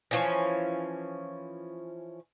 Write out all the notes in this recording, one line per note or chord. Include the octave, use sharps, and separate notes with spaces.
E3 F3 C#4